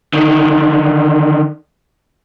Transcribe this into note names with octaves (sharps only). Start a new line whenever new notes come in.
D3 D#3